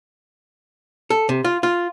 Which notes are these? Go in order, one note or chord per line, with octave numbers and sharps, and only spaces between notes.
A4
C3
F4
F4